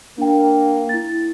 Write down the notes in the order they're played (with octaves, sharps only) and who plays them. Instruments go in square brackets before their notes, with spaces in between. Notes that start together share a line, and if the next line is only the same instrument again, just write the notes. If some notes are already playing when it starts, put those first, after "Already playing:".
[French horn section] A#3 [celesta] D4 G5
[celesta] E4 A6